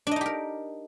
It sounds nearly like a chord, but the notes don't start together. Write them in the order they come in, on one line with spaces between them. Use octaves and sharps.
D4 D#5 D#4 G4 A#4